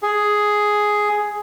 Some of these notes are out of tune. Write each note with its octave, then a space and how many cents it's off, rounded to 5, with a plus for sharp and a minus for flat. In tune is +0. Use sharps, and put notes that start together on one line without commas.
G#4 +5